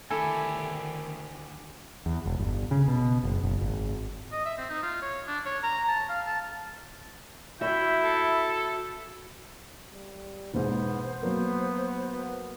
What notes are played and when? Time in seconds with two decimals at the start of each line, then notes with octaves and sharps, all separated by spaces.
0.10 D2 D#3 E4 G4 A4 G#5
2.06 E2
2.26 E1
2.39 G1
2.71 C#3
2.88 B2
3.24 F#1
3.43 F#1
3.61 G#1
4.32 D#5
4.45 E5
4.58 C4
4.69 D#4
4.83 F4
5.02 C#5
5.27 D4
5.45 C#5
5.63 A#5
5.88 A5
6.09 F5
6.26 A5
7.61 E4 F#4 E5 G5
8.04 A4
9.92 G3
10.54 E1 G#2 B3 C5
11.22 F#3 A#3 B3 A#4